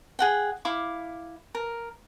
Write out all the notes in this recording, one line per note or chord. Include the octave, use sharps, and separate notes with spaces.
G#4 F#5 G5
E4 E5 F5 D6
A#4